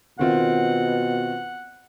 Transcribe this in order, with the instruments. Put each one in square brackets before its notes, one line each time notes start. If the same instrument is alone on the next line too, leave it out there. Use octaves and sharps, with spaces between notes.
[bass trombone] B2 [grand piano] D#3 C4 F4 [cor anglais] F#5